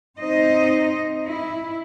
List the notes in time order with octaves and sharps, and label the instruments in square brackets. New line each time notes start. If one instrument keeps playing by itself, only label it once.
[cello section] C4 D#4 C5 D#5
E4